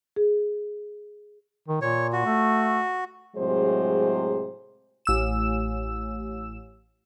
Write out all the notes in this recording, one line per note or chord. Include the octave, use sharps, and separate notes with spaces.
G#4
D#3
A#2 C#5
F#4
A3
A2 C3 F#3 G#3 G#4 C5
A1 E6 E7